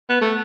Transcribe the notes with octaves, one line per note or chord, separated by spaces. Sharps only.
B3
A3